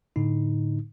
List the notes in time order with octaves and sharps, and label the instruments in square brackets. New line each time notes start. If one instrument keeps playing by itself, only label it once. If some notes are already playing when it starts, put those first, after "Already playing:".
[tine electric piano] A2 D3 D#4